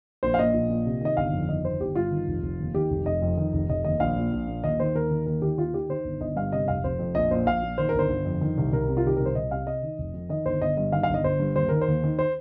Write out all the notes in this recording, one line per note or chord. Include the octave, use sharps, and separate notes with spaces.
A#1 C5
F5
A#2 D#5
A#1
A#2
C3
D#3 D#5
G1 F5
F2
D#3 D#5
G1 C5
G1 G4
G2 F4
D#3
F1
F1
D#2
D#3 G4
F1
F1 D#5
F2
D#3
F1
F1 D#5
D#2 D#5
A#1 F5
A#2
A#1
A#2
D#2 D#5
D#3 C5
D#2 A#4
D#3
D#2 A#4
D#3 G4
D#2 F4
D#3 G4
D#3 C5
G1
G1 D#5
G2 F5
C3 D#5
F1 F5
F1 C5
F2
A#1 D#5
A#2 C5
A#1 F5
A#2
D#3 C5
A#4
G1 C5
G1
F2
D#3
C2
C2 A#4
C3
F4
D#3 G4
C2 A#4
C5
C2 D#5
C3 F5
C3 D#5
D#3
F1
F2
D#3 D#5
G1 C5
G1 D#5
G2 D#5
D#3 F5
F5
G1 D#5
G1 C5
G2
D#2 C5
D#3 A#4
C5
D#2
D#3
C5